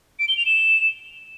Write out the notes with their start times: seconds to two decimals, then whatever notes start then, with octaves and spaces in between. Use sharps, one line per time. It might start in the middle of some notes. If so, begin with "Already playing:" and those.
0.19 D7
0.28 G7
0.37 F7
0.46 E7